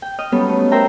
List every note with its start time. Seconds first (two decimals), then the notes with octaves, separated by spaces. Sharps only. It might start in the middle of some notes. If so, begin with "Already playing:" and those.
0.02 G5
0.18 D#5 D#6 F6
0.32 F#3 G3 B3 C#4 A4
0.49 A3
0.72 A#4 C5 E5 G5 A#5